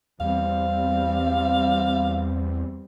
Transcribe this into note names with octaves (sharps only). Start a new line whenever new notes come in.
E2 G3 C4 F5